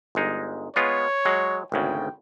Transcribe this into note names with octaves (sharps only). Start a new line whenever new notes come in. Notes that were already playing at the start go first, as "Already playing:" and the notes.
G1 G#3 D#4
G#3 B3 F4 C#5
F#3 G#3
G#1 D2 C#3 G5